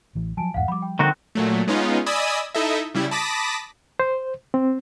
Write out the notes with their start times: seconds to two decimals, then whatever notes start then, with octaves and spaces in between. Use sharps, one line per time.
0.15 A1 E3
0.37 F3 F#3 G#5 A5 D7
0.54 A1 E2 G#2 F5 F#5
0.68 F3 G3 B5 D6
0.82 G5
0.99 D3 D#3 C4 F#4
1.35 A#2 F#3 A3
1.67 G#3 B3 C#4 D#4 F4
2.06 D5 D#5 G#5 B5 D#6 E6
2.55 D#4 E4 A4 D#5 E5
2.94 C#3 G3 E4
3.11 A5 B5 D6 D#6 A#6 B6
4.00 C5
4.54 C4